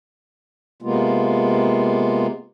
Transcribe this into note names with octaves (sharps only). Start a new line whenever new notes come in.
C3 G#3 A#3 B3 F4